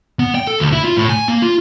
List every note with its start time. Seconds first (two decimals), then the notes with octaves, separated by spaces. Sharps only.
0.19 B3
0.35 G5
0.47 A4
0.60 D2
0.72 E4
0.85 F4
0.97 A2
1.09 G#5
1.28 A#3
1.42 F4